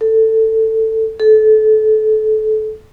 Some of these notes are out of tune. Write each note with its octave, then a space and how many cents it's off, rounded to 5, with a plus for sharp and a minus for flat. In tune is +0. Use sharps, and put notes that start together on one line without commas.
A4 +15
A4 -25